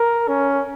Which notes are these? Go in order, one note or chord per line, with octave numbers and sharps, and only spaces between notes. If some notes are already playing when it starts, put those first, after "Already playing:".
Already playing: A#4
C#4